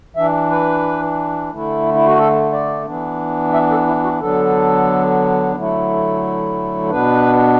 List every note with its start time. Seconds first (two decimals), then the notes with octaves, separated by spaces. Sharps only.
0.16 E3 D4 E5
0.50 B4
1.51 D3 A3 E4
1.94 E4
2.06 F#4
2.18 A4
2.52 D5
2.86 E3 B3 D4
3.53 E5
3.71 A4
3.87 E4
4.04 F#4
4.21 D3 F#3 B3 D4 A4
5.56 D3 F#3 A3 E4
6.90 B2 B3 D4 B4